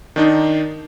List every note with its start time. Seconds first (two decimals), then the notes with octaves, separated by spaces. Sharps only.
0.16 D#3 D4 D#4